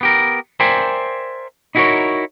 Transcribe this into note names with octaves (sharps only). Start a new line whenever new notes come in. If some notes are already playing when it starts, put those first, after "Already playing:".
B3 G4 A#4
A#4 C5 D5 E5 G5 G#5
D#4 E4 F#4 A4 A#4 C#5